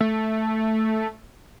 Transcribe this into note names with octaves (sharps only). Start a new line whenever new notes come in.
A3